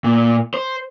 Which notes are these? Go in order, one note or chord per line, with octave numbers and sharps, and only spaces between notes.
A#2
C5